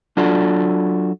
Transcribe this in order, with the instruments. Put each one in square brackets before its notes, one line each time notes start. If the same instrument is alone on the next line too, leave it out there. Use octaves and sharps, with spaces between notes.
[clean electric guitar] F#3 D4 F4 F#4 A4 D5